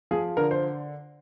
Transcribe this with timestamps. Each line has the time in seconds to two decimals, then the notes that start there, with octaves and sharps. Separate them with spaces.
0.11 F3 G#4
0.37 D3 A#4
0.51 C5